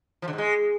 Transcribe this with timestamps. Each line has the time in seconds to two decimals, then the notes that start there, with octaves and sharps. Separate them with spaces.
0.22 F3
0.28 D3
0.33 G#2
0.38 G#3